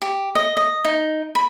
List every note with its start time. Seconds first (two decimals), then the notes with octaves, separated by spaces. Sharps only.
0.02 G4
0.35 D#5
0.57 D#5
0.85 D#4
1.35 B5